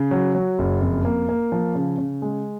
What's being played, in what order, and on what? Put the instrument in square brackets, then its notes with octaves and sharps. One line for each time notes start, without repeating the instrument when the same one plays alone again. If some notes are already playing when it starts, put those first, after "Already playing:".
Already playing: [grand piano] C#3
F#3
F#3
F#1
F2
A#3
A#3
F3
C#3
C#3
G#3